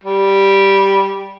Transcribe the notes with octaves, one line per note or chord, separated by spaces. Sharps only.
G3